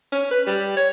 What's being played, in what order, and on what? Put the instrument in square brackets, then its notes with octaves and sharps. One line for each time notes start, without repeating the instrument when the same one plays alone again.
[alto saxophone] C#4
B4
G3
C#5